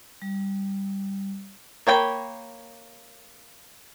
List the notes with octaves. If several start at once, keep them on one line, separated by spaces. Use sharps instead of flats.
G3
A#3 C#5 G5 B5